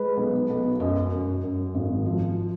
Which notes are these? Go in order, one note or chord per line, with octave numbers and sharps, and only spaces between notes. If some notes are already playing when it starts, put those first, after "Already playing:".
Already playing: G#3 B4
B1
B1
F#2 D#5
F#2
F#2
G#1
F3